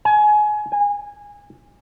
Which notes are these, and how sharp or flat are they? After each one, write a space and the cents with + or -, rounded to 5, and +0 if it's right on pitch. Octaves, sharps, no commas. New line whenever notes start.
G#5 +25
G#5 -20